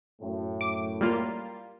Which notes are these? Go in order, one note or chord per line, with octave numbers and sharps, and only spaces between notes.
F#2 A2
D6
G3 A#3 F4